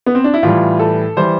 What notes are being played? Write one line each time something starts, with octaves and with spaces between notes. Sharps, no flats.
B3
C4
D4
E4
A2 E3 G3 F4
A4
E3 G3 C5